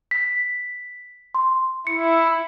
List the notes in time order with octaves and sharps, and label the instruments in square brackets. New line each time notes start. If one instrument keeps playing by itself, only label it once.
[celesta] B6
C6
[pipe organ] E4 [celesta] C#7